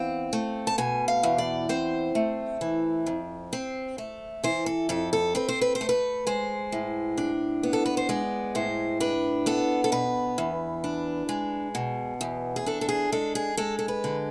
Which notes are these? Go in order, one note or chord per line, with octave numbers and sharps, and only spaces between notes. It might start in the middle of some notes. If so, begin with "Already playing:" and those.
Already playing: E2 C4 F5
A3
A5
B2 G#5
F5
E2
D5
C4 C5
A3
E3
F2
C4
A3
E3 C5
A4
F2 A4
A4
C4 B4
C5
B4
C5
A3
B4
G#3 C5
A2
D4
B3
A4
B4
C5
G#3 D5
A2 C5
D4 B4
B3 A4
A4
B2 B4
E2
D4
G#3
B2
E2
G#4
D4 A4
A4
G#4
G#3 A4
G#4
G#3 A4
A4
B4
D3